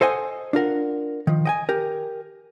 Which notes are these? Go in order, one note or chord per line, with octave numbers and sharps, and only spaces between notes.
A4 C5 D#5 F#5 G#5
D4 F4 A#4 F#5
D#3 F3
D#5 G5 G#5
G4 A#4